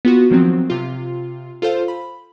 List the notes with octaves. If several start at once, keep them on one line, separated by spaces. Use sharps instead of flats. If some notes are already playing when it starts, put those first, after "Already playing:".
B3 F4 F#4
D#3 F3 F#3 C4
C3 F4
F4 A4 C5 F5
B5